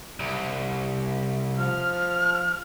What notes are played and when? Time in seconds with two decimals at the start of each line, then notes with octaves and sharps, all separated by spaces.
0.20 C2
1.58 F3 F6